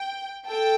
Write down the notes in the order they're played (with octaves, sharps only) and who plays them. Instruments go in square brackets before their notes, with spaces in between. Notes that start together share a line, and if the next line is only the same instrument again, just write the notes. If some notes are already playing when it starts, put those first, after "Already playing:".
Already playing: [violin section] G5
A4 G5